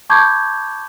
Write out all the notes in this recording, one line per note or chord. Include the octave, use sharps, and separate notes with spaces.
A5 B5 C#6 D6 G6 G#6